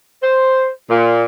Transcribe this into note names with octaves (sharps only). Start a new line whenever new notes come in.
C5
A#2